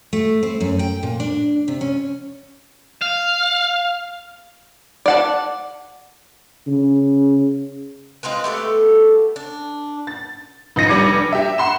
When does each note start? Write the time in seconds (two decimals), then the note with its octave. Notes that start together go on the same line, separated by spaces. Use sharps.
0.13 A3
0.43 C4
0.60 F#2
0.79 G5
1.03 A#2
1.20 D4
1.68 C3
1.81 C#4
3.02 F5
5.06 D5 F#5 A5
6.67 C#3
8.23 G#3 C4 F4 B4
8.44 A3 B3 G4 A4
9.36 D4
10.07 A6
10.76 A1 F3 D#4 A#6 C#7 D#7
10.88 F1 G3 D4 D6 G#6 C#7
11.33 G4 E5
11.58 F#5 C6 E7